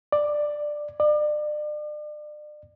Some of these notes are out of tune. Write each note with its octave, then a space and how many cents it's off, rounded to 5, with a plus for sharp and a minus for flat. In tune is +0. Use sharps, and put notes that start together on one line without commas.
D5 +10
D5 +35